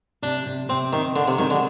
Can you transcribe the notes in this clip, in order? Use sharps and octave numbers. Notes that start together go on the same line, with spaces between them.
C3 D4
C3
C3 C4
D#3 C4
D3 C4
C3
D#3 G#3
D3